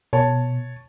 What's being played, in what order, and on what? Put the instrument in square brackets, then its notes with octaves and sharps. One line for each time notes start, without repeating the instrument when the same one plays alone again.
[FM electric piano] B2 [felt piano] C#5 A5